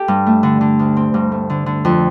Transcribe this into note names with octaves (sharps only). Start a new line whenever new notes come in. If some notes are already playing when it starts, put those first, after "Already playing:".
Already playing: G4 A4
G2
A3
D3
D3
D2
C4
G2
A3
D3
D3
F2